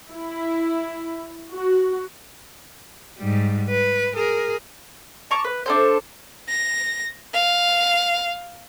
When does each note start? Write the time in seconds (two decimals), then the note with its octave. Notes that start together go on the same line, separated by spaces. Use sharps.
0.11 E4
1.53 F#4
3.19 G#2 G3
3.70 B4
4.15 G#4 A#4
5.31 A5 A#5 C#6 D6
5.44 B4
5.66 D4 A4 C5
6.49 A#6
7.34 F5